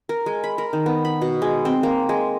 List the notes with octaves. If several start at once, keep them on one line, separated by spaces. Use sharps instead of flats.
A#4
G#3
B5
A#4
D#3
B3
B5
B2
G#3
C4
A#3
G#3